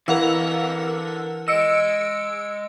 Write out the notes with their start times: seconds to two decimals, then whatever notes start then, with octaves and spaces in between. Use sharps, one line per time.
0.08 D3 E3 A#4 F5 F#5 E6
1.48 G#3 D#5 E6 C#7 D7